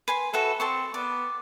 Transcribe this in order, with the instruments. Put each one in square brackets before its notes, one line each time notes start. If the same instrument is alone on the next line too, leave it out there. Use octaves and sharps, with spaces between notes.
[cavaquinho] B4 G#5 C6
[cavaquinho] F#4 B4 E5 [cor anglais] A4
[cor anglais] C4 [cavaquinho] A4 C6 C#6
[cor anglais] B3 [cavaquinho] D5